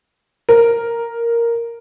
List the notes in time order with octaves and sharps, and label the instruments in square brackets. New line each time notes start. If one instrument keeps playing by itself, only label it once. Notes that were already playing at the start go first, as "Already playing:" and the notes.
[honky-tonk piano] A#4